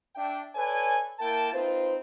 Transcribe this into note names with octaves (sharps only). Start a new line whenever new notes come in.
D4 E5 G5
A4 B4 C#5 D5 G#5
A#3 E4 A#4 G5 A5
C4 D#4 F4 B4 C5